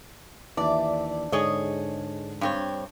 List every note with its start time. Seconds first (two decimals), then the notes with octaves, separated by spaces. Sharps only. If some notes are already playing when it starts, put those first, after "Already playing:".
0.57 D#2 E3 D4 D5 E5 D6
1.32 G#2 D3 G#4 C#5 D#5
2.41 G2 C4 C#5